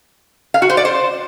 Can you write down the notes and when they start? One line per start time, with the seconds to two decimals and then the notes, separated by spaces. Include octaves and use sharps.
0.54 F5
0.62 F#4
0.70 C5
0.77 D5
0.85 C5